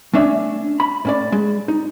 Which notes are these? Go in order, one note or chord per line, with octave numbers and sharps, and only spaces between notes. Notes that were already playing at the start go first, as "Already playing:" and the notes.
A3 C#4 D4 E5
B5
A2 C#4 D5
G#3
D#4